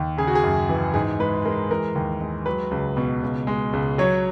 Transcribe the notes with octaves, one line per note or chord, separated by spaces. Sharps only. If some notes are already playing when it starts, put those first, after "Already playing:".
Already playing: D#2
C#3 G#4
F#4
G#4
F#2
E3
G#2 G#4
G#3 B4
G#3 A#4
E3 A#4
D#2
G#3
F#3 B4
C#2
B2
C#2
G#3
C#2
F#3 C#5